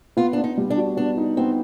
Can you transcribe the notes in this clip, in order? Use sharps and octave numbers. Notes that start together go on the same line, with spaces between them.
B3 F4
B3 D4
D#4
G3
D4
F#4
B3 D4
D#4
B3 C4